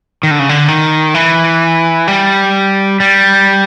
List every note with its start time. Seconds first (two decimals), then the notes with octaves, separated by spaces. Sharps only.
0.23 D#3
0.31 D3
0.39 C#3
0.49 D3
0.68 D#3
1.14 E3
2.08 G3
3.00 G3